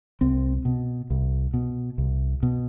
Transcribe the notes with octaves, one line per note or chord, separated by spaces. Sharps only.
C2 C4
B2
C2
B2
C2
B2